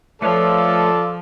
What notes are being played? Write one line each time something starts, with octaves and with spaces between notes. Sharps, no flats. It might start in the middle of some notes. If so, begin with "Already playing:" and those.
F3 A3 F4 A4 B4 C#5 D5